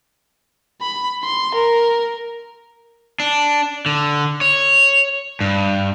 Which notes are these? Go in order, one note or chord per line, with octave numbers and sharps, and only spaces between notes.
B5
C6
A#4
D4
D3
C#5
G2